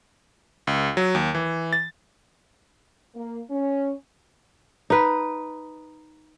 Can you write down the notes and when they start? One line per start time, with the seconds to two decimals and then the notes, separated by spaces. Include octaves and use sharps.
0.67 C#2
0.97 F#3
1.15 D#2
1.35 E3
1.73 A6
3.14 A#3
3.50 C#4
4.90 D#4 B4